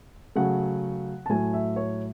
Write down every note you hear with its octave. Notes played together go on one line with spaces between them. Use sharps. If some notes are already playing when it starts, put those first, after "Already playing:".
C#3 F#3 A3 F#5
A5
A2 F#3 A3 G#5
E5
C#5